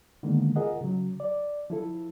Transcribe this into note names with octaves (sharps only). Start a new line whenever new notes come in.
D3 D#3 G#3 A#3 B3
F4 G#4 A#4 D#5 F#5
C#3 F#3
D5
F3 E4 A4